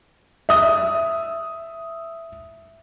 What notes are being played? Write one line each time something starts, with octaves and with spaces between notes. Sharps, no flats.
E5 D#6